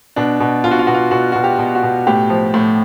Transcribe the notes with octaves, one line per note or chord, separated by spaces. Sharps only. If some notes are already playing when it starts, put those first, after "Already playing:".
B2 D4
B2
B2 F4
F#4
F4
B2 F#4
F4
B2 F#4
B2 F#4
G4
B2
F#4
B2
A2 G4
F3
A2